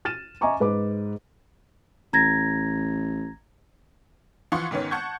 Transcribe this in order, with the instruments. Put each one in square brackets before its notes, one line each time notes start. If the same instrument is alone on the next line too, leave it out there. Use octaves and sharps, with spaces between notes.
[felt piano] F6 A6 D#7 E7
D#5 E5 G#5 A#5 C#6 D6
G#2 B4 D6
[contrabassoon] A1 [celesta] A#5 G#6 A#6
[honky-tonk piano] E3 F3 F4 F#5 C6 C#6
G#2 D#3 B3 C#4
F#5 A5 C#6 G6 G#6